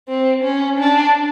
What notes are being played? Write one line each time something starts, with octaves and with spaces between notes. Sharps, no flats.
C4
C#4
D4